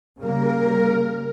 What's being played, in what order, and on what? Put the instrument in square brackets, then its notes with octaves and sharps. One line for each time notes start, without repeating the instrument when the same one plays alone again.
[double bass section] C#3 G3 A#3 [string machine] A#4